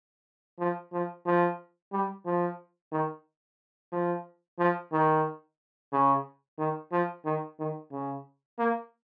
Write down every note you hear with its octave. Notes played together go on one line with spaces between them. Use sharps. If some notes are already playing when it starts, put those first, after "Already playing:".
F3
F3
F3
G3
F3
D#3
F3
F3
D#3
C#3
D#3
F3
D#3
D#3
C#3
A#3